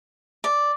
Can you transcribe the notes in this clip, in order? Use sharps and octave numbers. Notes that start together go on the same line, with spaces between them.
D5